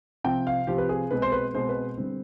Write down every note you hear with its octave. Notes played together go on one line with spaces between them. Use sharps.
C3 F3 C4 G5
F5
C3 F3 C4 G4
B4
G#4
B2 G#3 C4 B4
C5
B4
B2 G#3 C4 C5
B4
D3 G3 C4